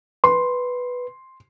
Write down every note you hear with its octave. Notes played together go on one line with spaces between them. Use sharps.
B4 C6